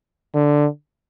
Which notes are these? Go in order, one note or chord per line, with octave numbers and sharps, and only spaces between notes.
D3